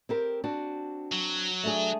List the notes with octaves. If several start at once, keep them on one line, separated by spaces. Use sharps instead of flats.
C4 G4 A#4
C4 D4 F#4
F#3
A3 D4 G#4